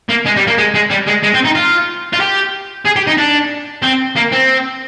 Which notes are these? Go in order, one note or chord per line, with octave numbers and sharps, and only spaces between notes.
A#3
G#3
G3
A#3
G#3
G#3
G3
G#3
G#3
C4
D#4
F4
F4
G4
G#4
G4
D#4
D4
C4
A#3
C4